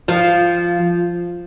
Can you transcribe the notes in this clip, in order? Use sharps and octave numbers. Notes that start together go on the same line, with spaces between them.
F3